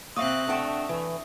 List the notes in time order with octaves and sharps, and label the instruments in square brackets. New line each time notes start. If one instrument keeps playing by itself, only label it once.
[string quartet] C3 C4 F#6 [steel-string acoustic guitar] A#3 [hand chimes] E5 C#6 D#6
[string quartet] A3 [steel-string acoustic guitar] D4 F#5 G5
[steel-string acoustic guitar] E3